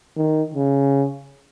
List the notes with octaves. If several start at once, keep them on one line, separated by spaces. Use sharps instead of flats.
D#3
C#3